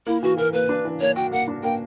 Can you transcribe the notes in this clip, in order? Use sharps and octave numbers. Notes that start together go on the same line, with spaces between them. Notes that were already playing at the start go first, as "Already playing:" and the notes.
A#3 E4
E3 F#4
E3 A#4
A#3 B4
D4
E3
A#3 C#5
F#4 G5
A#3 F#5
D4
A#3 G5